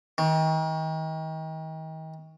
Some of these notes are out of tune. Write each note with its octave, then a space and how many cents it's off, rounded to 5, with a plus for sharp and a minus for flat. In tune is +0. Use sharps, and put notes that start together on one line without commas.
D#3 +35